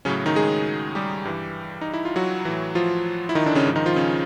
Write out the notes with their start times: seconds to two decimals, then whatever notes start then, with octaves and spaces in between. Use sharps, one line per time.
0.05 A2 C#3 F#3 C#4
0.26 D#3 D#4
0.35 G#3 G#4
0.95 G3 G4
1.25 G2 E3
1.81 D#4
1.94 E4
2.05 F4
2.16 F#3 F#4
2.45 A2 E3
2.75 F3 F4
3.29 E4
3.35 D#3 D#4
3.46 D3 D4
3.55 C#3 C#4
3.66 G#2 F3
3.76 D#3 D#4
3.86 F3 F4
3.96 C#3 C#4